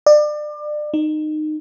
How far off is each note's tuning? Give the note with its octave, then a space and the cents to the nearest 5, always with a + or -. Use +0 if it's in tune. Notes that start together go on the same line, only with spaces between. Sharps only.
D5 +30
D#4 -20